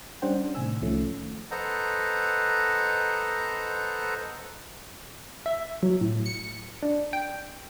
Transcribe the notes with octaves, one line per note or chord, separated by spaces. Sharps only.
G3 C#4 D4 C5 F#5 G5
D4
A2 C3 D#3 G#5 E6
C2 D#3 F3 A3 C#4
A4 B4 C5 D#5 F#5 A#5
E5
F#3
A2
C#7
D4
G5